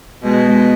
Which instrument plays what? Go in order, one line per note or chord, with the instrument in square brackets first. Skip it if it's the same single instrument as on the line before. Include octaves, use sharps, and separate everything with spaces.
[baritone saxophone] B2 [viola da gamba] G#3